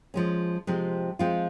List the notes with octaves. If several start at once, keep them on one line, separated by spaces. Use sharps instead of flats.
F3 G#3 C#4
C3 F3 G#3 C4
F3 G#3 C4 F4